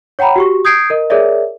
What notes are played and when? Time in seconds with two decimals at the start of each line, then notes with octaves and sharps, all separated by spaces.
0.19 C#5 F#5 G5 A#5 B5
0.36 F#4 G4 C#6
0.65 D#6 G6 G#6 C7 D7
0.90 A#4 D#5
1.10 G#4 A#4 C#5 D5 E5